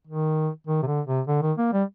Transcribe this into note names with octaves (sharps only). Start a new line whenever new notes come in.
D#3
D#3
C3
D3
C3
D3
D#3
A#3
G3